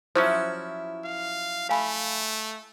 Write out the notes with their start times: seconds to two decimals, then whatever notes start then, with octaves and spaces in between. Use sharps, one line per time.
0.16 F3 F#3 C#4 E4 C5
1.04 F5
1.69 A3 F5 G#5 B5